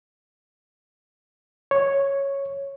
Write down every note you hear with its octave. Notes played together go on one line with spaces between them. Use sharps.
C#5